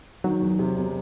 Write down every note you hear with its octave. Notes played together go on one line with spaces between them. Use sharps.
D#3 F#3
E2
C3
E1